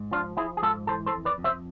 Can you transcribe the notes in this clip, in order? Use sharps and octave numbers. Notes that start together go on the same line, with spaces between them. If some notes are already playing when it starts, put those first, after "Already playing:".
Already playing: G#2
F3 D4 F4
F3 E4 G#4
G#4
G#2 F4 A4
E3 A4 C5
A4 C5
F2
B4 D5
F2
C5 E5